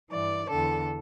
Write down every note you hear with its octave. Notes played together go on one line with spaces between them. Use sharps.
G2 E3 D5
E2 D3 A4